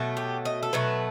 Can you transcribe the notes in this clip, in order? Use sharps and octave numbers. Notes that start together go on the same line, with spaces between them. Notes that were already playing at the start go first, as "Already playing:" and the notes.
Already playing: B2 F#3 A3
G4
D#5
A4
B2 F#3 A3 B4